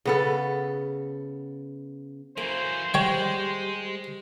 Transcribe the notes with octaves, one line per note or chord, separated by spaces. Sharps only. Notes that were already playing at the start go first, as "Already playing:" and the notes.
C#3 B3 A4
E3 F#3 A#3 C5
G3 G#3 C#5 G5